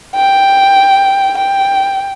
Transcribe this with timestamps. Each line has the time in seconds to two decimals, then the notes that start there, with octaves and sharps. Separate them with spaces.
0.15 G5
1.37 G5